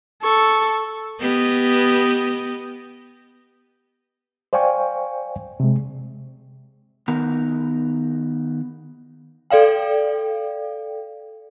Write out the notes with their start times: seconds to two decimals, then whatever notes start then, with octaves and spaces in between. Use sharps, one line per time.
0.23 A4 C#6
1.20 B3 G4 D#5
4.53 C5 D5 F5 G5 G#5 C#6
5.60 C3 G#3
7.08 D#3 B3 D#4 A#4 A#5
9.50 A4 D5 F5 G5